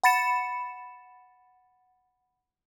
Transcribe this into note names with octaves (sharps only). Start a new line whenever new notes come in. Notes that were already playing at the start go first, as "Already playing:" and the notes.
F#5 B5 A6 C#7 E7